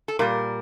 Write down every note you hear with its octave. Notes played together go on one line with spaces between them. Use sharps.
A4
A#2 G3 A#4